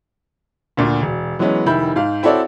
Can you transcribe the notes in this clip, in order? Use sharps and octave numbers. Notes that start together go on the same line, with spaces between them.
D2 A#2 D3
E1
E3 F#3 G#3 B3 C#4
F1 D#3 E4 B5 G6
G#2 F5
C4 E4 F#4 A4 C#5 D5